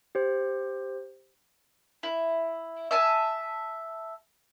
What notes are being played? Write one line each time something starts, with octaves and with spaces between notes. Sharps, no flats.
G4 C5
E4
E5 G#5 A5